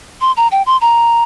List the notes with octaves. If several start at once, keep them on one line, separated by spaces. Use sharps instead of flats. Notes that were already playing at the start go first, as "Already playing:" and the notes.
C6
A#5
G5
C6
A#5